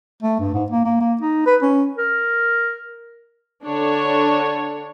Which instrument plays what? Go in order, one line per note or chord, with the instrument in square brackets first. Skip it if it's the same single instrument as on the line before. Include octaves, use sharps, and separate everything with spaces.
[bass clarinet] A3
G2
G#2
A#3
A#3
A#3
D#4
B4
C#4
[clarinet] A#4
[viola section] D3 D4 C#5